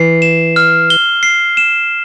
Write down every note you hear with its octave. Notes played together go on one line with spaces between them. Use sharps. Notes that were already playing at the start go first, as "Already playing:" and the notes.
Already playing: E3 C7
E7
F6
G7
C7
E7